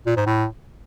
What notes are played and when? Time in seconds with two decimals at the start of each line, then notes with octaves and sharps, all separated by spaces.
0.06 A#2
0.16 G#2
0.27 A2